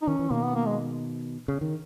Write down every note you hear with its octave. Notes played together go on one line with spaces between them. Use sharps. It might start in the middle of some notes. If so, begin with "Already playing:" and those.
D#4
D#3 C#4
E3
B2 D#3 A#3
B3
A#3
G#3
C#3
D#3